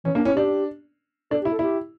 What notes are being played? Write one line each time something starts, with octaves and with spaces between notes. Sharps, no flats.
E3 C#4
A#3 D4
C#4 E4
D4 G4
D4 A4
G4
E4
A4
E4 G4